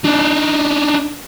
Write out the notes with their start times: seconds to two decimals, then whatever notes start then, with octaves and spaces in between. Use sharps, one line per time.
0.04 D4 D#4